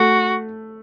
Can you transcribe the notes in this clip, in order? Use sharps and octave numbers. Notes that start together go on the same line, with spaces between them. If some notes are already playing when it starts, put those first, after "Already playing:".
Already playing: A3 F#4